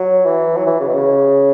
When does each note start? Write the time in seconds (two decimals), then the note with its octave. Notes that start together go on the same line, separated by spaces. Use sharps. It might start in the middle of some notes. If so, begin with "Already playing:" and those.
Already playing: F#3
0.25 E3
0.57 F#3
0.66 E3
0.80 C#3
0.88 B2
0.94 C#3